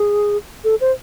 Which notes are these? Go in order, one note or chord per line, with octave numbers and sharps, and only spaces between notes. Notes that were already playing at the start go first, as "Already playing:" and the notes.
Already playing: G#4
A4
C5